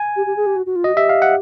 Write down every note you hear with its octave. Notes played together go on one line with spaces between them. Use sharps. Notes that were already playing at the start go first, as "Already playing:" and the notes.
Already playing: G#5
G4
G4
G#4
G4
F#4
F#4
F4
F#4 D#5
G4 E5
F5
F#5